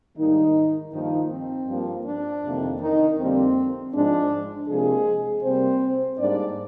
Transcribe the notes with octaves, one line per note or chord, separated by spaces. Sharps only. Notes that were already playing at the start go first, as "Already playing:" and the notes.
G#2 D#3 G3 A#3 D#4
G2 D#3 F3 A#3 D#4
C4
G2 F3 A#3
D4
F2 C3 D#3 A#3
D#3 D#4
F2 D3 G3 A#3 C4
G#2 F3 G#3 D4
C3 F3 G#3 A#3 G#4
C3 G3 A#3 C4 C5
G#2 G3 A#3 D4 D5